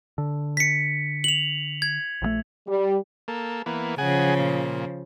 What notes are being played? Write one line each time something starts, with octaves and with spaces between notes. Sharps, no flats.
D3
B6 C#7
F7 F#7
G#6
A#1 D3 A3
G3
A#3 A4
E3 A#3 B3
C#3 F3 G#4 F#5 G#5
A#2